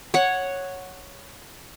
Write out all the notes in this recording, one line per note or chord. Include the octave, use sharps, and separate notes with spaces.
C#5 F#5